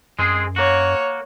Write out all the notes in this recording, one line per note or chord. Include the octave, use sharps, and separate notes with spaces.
F#2 G#3 C4 G#4
A#3 F#4 C#5